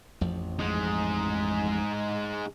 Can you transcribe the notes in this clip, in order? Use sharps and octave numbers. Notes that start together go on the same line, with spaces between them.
A1 F2 F3
G#3 D#4